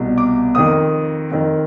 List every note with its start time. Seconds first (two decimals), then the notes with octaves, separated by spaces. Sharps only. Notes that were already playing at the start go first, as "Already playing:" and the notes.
Already playing: C2 B2
0.18 D6
0.55 F2 D#3 D#6
1.31 F2 D#3